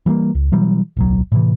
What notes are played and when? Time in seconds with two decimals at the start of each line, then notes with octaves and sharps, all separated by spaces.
0.06 E3 G3 A3 A#3
0.35 C#2
0.52 B2 E3 F#3 G3
0.97 D1 B1 F#3
1.32 A2 C3 E3